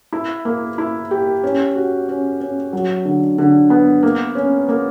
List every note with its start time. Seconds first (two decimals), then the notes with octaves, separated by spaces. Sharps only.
0.13 E4
0.45 A#3
0.78 E4
1.11 G4
1.44 C#4
1.75 F#4
2.08 C#4
2.40 C#4
2.73 F#3
3.05 D3
3.38 D3
3.70 B3
4.03 A#3
4.35 C#4
4.69 A#3